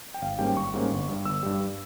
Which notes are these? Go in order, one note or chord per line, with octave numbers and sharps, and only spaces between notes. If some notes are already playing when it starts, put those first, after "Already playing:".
G5
G#1 F5
G#2 G3 A#3 C#4 G5
G#1 C#6
G#2 G3 A#3 C#4
G1
G2 G3
G1 E6
G2 G3
G2